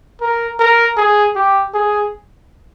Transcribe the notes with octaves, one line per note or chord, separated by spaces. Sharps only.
A#4
A#4
G#4
G4
G#4